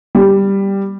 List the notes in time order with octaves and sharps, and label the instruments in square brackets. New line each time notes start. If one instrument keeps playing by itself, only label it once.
[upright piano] G3